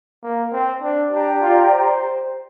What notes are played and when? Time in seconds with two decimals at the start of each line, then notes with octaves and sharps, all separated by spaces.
0.23 A#3
0.52 C4
0.82 D4
1.11 D4 G4 D5 G5 A#5
1.41 F4
1.70 C5